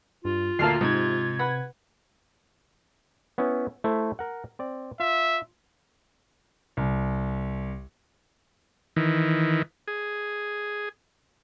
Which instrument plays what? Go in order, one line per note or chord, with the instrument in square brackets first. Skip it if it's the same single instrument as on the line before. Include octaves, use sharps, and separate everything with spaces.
[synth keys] G2 [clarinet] F4
[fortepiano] D2 A#2 A#3 [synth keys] A5 F6 C7
[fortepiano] G#2 [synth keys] C3 G#6
[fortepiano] B4 F#5 B5
[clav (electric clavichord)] B3 C#4 E4
A3 E4 C5
A#4 F#5
C4 D5
[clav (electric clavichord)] F4 [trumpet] E5
[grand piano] C2
[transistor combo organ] D#3 E3
G#4